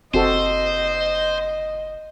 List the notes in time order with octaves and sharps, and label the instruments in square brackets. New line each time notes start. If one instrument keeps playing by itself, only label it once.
[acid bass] F#1 [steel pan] C4 F#4 A4 [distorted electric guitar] C5 [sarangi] D#5